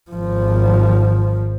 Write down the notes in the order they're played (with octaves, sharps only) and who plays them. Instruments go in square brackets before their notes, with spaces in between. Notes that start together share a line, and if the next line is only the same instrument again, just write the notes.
[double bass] G#1 F3